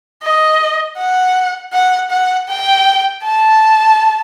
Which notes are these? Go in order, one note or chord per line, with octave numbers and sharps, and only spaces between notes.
D#5
F#5
F#5
F#5
G5
A5